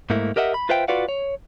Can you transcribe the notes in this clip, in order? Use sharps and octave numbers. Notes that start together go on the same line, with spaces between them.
G#2 A3 A#3 E4
G4 A#4 D#5 E5 F#5
B5
F4 B4 C5 E5 F5 G5
F4 F#4 B4 D5 F5 F#5
C#5